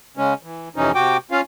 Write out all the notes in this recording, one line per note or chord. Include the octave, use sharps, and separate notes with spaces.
C#3 G#3 C#4
E3
F2 C3 E3 C#4 D#4
C3 F#4 G5 D6
C#4 F4 F5